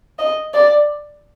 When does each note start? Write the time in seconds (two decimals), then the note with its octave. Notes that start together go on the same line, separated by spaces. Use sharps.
0.19 D#5
0.54 D5